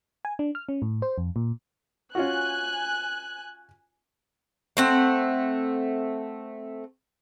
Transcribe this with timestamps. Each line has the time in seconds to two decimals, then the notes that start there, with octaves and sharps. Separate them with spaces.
0.25 G#5
0.39 D4
0.55 F6
0.69 C#4
0.82 A2
1.02 C5
1.18 F2
1.36 A#2
2.15 C#4 F4 F#4 G#5 F#6
4.77 A3 C4 F#5